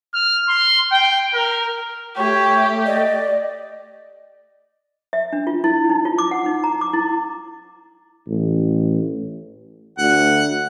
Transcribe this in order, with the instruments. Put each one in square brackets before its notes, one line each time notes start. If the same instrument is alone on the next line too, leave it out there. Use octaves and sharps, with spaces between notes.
[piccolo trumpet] F6
C6
G5
A#4
[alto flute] A3 [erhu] G4 [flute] C#5 [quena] C#6
[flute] D5 [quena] D#5
[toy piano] E5
D4
F4
E4
D#4
F4
D6
F#5
D#4
A#5
D6
E4
[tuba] A1
[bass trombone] D2 [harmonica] F#5